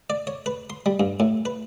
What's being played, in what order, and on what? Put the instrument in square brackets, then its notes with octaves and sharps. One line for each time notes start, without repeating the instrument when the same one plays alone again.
[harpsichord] D5
C#5
B4
C6
G3
G2
A2
B4